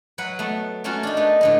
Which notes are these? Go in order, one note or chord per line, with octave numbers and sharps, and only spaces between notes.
F#3 B4 F#5
A3 B3
A3 A#3 C#4 F4 F#4
D4 D#4
A3 B3
A2 D3 B3